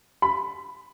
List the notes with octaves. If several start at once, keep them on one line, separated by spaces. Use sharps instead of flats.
B5